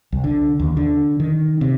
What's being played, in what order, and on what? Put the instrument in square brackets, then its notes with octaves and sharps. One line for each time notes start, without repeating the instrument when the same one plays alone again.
[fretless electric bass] C2
D3
D#2
D3
D#3
C3